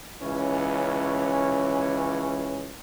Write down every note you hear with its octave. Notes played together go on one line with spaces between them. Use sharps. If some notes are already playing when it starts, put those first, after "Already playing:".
C#2 E3 C#4